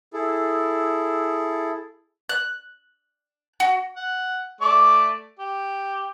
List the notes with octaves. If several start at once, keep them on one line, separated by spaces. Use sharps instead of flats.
E4 G#4 A4
F#6
F#4
F#5
A3 D5 D6
G4